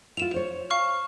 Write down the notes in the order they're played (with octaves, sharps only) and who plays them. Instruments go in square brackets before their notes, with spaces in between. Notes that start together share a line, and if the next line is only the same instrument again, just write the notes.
[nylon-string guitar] E4 F4 [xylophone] E7 F7
[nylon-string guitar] C5 C#5
[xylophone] F5 C#6 F6